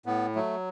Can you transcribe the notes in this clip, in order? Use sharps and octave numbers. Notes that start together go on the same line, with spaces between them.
A2 B3
F#3 A3